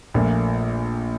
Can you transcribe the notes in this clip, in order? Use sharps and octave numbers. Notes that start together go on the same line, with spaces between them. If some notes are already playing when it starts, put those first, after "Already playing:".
A#1 A#2 A3